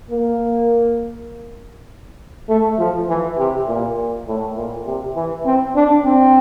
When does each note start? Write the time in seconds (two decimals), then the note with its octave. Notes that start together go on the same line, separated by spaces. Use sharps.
0.11 A#3
2.49 A3
2.79 F3
3.08 E3
3.38 C3
3.68 A#2
4.27 A2
4.57 A#2
4.86 C3
5.16 E3
5.46 C4
5.75 D4
6.05 C4